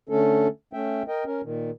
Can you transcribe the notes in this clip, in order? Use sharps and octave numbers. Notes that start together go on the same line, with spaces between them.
D3 A3 C#4 A4
A3 C#4 E5 G5
A#4 D#5 G5
C#4 A#4
A#2 D#3